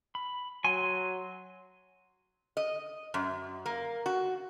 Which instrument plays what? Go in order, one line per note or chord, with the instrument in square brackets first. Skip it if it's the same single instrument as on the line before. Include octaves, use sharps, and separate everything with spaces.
[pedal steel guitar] B5
[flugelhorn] F#3 [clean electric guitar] G#5 [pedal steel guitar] C6
[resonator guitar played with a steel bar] D#5
F#2
A#3
F#4